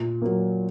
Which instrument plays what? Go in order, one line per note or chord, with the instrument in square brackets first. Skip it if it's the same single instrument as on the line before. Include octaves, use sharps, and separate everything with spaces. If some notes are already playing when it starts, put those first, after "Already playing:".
Already playing: [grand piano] A#2
F#3 A#3